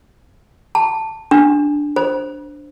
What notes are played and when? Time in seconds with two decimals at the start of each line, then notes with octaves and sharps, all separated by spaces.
0.75 A5
1.31 D4
1.96 C5